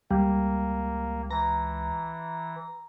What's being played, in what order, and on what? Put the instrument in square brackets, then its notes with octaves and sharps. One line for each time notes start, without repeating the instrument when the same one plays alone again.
[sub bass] C#2 [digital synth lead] G3 [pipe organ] A#3
[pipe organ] E3 [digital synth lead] A#5